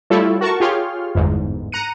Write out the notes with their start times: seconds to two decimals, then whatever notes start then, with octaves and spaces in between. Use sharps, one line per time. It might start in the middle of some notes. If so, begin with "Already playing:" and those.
0.10 G3 A3 E4 F4 A4 C#5
0.41 F#4 A#4 A5 C#6
0.60 F4 G4 G#4 C#5 C6 F6
1.15 G1 E2 G#2
1.72 A#5 F#6 C#7 D#7